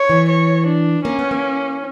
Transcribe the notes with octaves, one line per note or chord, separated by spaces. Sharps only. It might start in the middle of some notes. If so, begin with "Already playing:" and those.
Already playing: C#5
E3
C#5
D4
A#3 C#4
B3
A#3